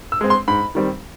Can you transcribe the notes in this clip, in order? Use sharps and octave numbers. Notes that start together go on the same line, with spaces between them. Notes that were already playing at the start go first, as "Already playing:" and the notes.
E6
G#3 C4
C6
G#2 B5
D#3 G3 C4